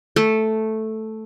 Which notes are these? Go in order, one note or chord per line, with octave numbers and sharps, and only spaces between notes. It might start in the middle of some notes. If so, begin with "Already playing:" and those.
A3